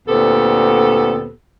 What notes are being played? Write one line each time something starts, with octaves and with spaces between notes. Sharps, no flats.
D2 A#2 B3 C4 G4 A4